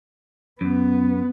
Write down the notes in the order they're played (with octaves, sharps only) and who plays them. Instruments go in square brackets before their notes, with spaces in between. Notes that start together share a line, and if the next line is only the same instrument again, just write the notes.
[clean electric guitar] F#2 [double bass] B3